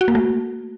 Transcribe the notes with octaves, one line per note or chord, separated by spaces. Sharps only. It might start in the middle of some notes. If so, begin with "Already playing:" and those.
F#4
A#3
A3